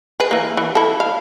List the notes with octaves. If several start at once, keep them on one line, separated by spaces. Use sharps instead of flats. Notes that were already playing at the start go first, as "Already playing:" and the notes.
G#4 B4
E3 A#3
E3
E4 A4
F5